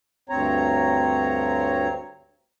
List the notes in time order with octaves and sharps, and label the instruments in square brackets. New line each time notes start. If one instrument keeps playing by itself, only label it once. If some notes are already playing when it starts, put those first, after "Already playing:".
[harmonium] D2 G2 C4 C#5 A#5